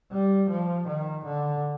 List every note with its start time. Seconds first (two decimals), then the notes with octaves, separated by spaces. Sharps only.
0.12 G3
0.50 F3
0.88 D#3
1.25 D3